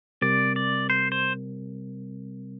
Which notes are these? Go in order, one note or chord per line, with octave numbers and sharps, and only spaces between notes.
C3 G3 C4 A#4 D5
D5
C5
C5